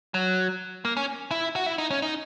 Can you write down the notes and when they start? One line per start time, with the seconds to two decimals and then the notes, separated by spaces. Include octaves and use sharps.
0.14 F#3
0.85 A#3
0.97 C#4
1.31 E4
1.56 F#4
1.66 E4
1.78 D#4
1.91 C#4
2.02 D#4